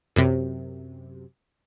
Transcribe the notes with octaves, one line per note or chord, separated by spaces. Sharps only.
F#2 C3